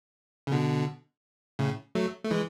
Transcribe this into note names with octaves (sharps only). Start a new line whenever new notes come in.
C#3
B2 D3
A2 C#3
F#3 A3
A3
E3 G#3